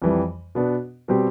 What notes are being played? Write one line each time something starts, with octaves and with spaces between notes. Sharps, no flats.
F2 E3 G3
B2 B3 D4
B2 G3 C4 G4